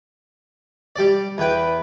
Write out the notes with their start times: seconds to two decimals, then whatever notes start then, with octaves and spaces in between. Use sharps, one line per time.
0.96 G3 D5
1.38 E2 B4 G5